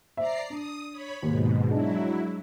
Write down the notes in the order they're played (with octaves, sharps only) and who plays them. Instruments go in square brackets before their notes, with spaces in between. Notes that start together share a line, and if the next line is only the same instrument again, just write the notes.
[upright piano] C5 E5 [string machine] D5 A#5 C7
[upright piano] D4 [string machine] D#6
[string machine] C#5 B5
[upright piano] D#2 [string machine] G#2 B2
[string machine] F#3 E4 [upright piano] G#3 D4